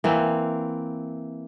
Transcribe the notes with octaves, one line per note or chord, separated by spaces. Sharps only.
E3 A#3 C4